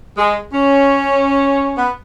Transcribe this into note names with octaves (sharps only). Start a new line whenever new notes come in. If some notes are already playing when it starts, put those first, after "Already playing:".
G#3
C#4
B3